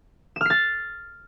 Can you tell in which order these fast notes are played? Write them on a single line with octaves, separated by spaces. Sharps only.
E7 F6 C7 A6